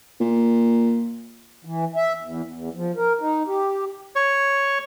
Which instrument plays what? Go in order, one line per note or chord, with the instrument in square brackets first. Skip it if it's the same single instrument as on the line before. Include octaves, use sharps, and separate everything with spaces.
[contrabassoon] A#2
[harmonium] E3
E5
E2
E2
F3
A#4
D#4
G4
[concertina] C#5